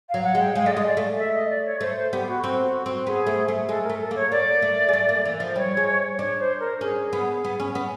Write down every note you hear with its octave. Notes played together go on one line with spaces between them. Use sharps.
F#3 F5
F#5
G#3
G5
G#3 F5
A3 D5
D#5
G#3
D5
A3
E5
D#5
D5
C#5
A3 C5
C5
B3 G4
F#4
C4 F#4
C4
B3 G#4
A3
A3
G#3 A4
A#4
A3
A4
A#3 C#5
A#3 D5
A3
G#3
A3
A#3
E3
F3
G3 C#5
G#3
D4 C#5
C5
A#4
C#4 G#4
B3
B3
C#4
B3